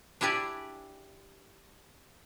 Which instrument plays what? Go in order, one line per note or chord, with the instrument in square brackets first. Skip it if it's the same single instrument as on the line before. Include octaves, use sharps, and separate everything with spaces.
[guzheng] D4 E4 G4 D5 G#5